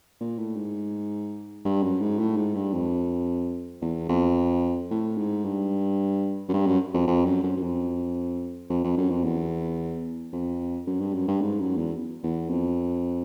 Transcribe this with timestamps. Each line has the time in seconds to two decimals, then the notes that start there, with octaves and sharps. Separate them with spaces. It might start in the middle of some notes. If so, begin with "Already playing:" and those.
0.20 A#2
0.38 A2
0.56 G#2
1.65 G2
1.83 F#2
2.01 G#2
2.19 A2
2.37 G#2
2.55 G2
2.73 F2
3.82 E2
4.09 F2
4.91 A2
5.17 G#2
5.45 G2
6.49 F#2
6.53 G2
6.67 F#2
6.94 F2
7.07 F2
7.25 F#2
7.43 F#2
7.56 F#2
7.62 F2
8.70 F2
8.84 F2
8.97 F#2
9.11 F2
9.24 E2
10.33 F2
10.87 F#2
11.01 G2
11.14 F#2
11.28 G2
11.41 G#2
11.60 F#2
11.77 E2
12.23 E2
12.50 F2